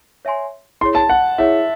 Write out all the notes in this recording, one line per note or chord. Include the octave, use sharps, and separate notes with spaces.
C#5 E5 G#5 C6
E4 G#4 C#5 C6
A5
F#5
E4 G#4 C#5 E5